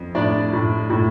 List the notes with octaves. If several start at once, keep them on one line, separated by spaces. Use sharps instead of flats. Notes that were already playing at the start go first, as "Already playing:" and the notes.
Already playing: F2
A2 D4 D5
A2
A2